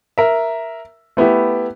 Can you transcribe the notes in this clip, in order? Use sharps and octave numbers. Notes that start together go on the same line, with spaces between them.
A#4 E5
A3 B3 E4 G4